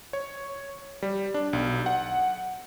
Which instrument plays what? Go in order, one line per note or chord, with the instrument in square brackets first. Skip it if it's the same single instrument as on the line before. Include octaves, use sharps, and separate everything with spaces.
[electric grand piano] C#5
G3
D4
B1
F#5